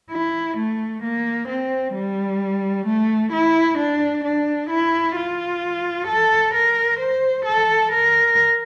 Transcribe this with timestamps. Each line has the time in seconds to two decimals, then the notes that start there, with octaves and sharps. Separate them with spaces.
0.11 E4
0.57 A3
1.03 A#3
1.48 C4
1.95 G3
2.86 A3
3.32 E4
3.78 D4
4.24 D4
4.70 E4
5.16 F4
6.07 A4
6.54 A#4
7.00 C5
7.45 A4
7.92 A#4